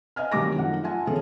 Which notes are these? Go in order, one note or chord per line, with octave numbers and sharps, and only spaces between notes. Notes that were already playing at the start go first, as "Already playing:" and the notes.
D#5 F5 G#5 F6
G#1 D#3 F#3 G3 D6 A#6
F#2 D#3 F3 A3 D#4 F#5
F4 E5 F#5 G#5 A5
B2 D#3 F3 C#4 G#4 A4